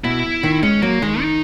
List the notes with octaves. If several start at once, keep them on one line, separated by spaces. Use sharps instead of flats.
B2 E4
D#3
G#3 C#4
F#3 A#3
D#3 G#3
D#4